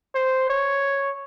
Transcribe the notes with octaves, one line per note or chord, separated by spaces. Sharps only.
C5
C#5